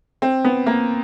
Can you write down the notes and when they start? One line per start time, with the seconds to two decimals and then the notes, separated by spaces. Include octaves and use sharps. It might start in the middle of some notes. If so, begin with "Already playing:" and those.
0.22 C4
0.44 B3
0.66 A#3